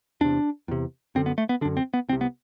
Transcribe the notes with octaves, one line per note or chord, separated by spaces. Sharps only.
E2 C3 D4
E2 C3
F#2 D3 C4
B3
A3
B3
F#2 D3 D4
C4
B3
C2 C3 C4
B3